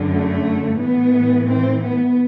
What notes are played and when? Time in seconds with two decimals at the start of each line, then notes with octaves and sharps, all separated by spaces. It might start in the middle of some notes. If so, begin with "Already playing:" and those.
Already playing: F#2 D3
0.11 A3
0.79 A2 E3 B3
1.48 C4
1.82 B3